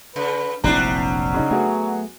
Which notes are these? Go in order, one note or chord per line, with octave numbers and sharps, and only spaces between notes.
C#3 B4
F1 A#1 F#3 G3 C4 D4 E4 A#5
C#3 D#4
A3 B3 F#4 G#4